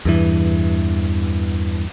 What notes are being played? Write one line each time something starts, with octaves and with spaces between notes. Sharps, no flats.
E2 G2 E3